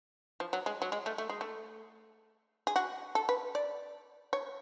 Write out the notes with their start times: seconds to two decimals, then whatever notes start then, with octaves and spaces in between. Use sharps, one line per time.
0.40 F3
0.53 F#3
0.66 G#3
0.82 F#3
0.92 G#3
1.06 A3
1.18 A3
1.29 G#3
1.41 A3
2.67 G#4
2.76 F#4
3.15 A4
3.29 B4
3.55 D5
4.33 C#5